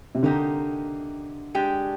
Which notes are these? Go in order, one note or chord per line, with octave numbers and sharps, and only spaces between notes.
C3
D3 A#3 D#4 G4
G#3 D4 G4